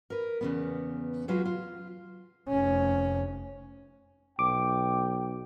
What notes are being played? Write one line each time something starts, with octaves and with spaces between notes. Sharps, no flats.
A#4 B4
E2 C#3 B3
F#3 G#3 F4 F#4 B4
F4
F1 C#4
B1 G5 D6